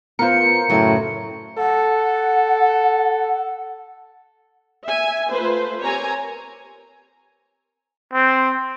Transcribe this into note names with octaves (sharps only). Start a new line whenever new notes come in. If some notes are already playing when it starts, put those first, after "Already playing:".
B3 F4 A#4 C5 C#7
F#2 A2 C#3 F#3
A4 F#5
E5 G#5
A3 F4 B4 C5
C4 G4 A#4 C#5 G#5 A#5
C4